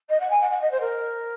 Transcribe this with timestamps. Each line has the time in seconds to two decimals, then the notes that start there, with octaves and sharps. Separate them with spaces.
0.09 D#5
0.19 F#5
0.30 G#5
0.40 F#5
0.50 F#5
0.61 D#5
0.71 C5
0.80 A#4